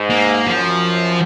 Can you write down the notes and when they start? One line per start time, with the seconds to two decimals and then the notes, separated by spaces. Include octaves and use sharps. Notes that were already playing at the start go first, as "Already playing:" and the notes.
Already playing: G#2
0.11 A#3
0.47 F#2 F3